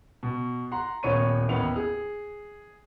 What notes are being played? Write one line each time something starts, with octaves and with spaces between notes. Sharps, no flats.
B2
F#5 A#5 C6
D#1 B3 C#5 C#6 D#7
A1 D#2 B3 F7
G#4